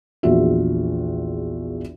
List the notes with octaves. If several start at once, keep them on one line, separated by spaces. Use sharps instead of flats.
A#1 E2 F4 F#4 E5